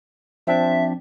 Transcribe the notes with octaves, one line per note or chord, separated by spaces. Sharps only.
F3 C4 D4 E5